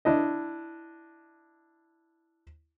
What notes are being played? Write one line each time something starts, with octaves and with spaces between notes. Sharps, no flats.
D4 E4 D#5